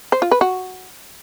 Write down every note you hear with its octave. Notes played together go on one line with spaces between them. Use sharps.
C5
F4
B4
F#4